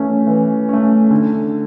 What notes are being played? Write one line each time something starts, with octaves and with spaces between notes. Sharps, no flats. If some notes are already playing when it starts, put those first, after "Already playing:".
Already playing: E3 A3 C#4
E3
A3 C#4
D3